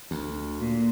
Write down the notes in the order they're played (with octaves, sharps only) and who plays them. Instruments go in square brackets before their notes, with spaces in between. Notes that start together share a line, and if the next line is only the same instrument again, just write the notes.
[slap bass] D2
[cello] A#2